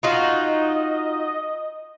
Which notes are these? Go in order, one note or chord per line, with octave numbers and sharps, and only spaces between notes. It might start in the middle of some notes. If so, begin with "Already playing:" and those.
D#4 F4 F#4 D#5